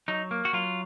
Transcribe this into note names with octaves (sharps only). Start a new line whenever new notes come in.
F#3 D#4
A#3
F#4
F#3 F4